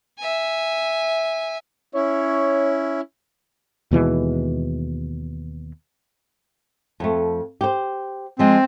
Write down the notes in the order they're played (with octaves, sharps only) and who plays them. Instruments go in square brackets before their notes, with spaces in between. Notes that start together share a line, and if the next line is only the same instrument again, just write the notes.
[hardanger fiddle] E5 G#5
[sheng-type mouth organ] C#4 E4 [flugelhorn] C#5
[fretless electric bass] D#2 B2 E3 G#3
[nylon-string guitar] F2 A3
G4 C5
[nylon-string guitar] F3 G#3 [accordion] C4